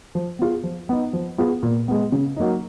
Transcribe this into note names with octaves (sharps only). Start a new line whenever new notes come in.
F3
B3 F4 G#4
F3
B3 D#4
F3
B3 F4 G#4
A#2
G#3 B3
C#3
F#3 A#3 D#4